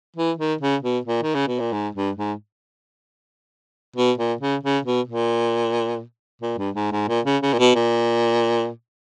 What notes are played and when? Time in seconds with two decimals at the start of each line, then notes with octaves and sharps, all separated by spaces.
0.17 E3
0.38 D#3
0.61 C#3
0.83 B2
1.06 A#2
1.23 D#3
1.35 C#3
1.47 B2
1.60 A#2
1.73 G#2
1.95 G2
2.17 G#2
3.96 B2
4.18 A#2
4.41 C#3
4.63 C#3
4.85 B2
5.08 A#2
6.42 A#2
6.58 G2
6.75 G#2
6.92 G#2
7.08 A#2
7.25 C#3
7.42 C#3
7.53 A#2
7.59 B2
7.75 A#2